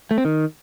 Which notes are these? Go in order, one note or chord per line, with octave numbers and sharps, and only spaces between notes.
A3
C4
D#3